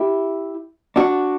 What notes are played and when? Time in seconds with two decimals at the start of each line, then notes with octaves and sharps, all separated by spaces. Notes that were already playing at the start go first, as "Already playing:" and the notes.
Already playing: E4 G4
0.96 D4 F#4